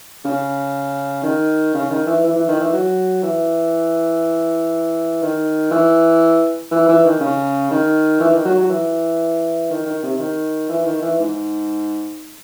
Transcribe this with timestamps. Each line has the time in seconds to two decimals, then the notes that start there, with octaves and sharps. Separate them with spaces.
0.25 C#3
1.23 D#3
1.74 C#3
1.90 D#3
2.06 E3
2.24 E3
2.36 E3
2.48 D#3
2.60 E3
2.73 F#3
3.23 E3
5.22 D#3
5.71 E3
6.71 E3
6.88 E3
7.05 D#3
7.20 C#3
7.71 D#3
8.20 E3
8.33 D#3
8.45 F#3
8.58 F#3
8.70 E3
9.70 D#3
9.86 D#3
10.03 C3
10.19 D#3
10.69 E3
10.85 D#3
11.02 E3
11.19 G#2